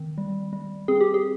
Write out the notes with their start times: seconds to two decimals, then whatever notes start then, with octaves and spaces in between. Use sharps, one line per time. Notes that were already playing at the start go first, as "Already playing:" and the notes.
Already playing: D#3 C4
0.18 G3
0.53 G3
0.88 C4 G#4
1.01 G4
1.14 G#4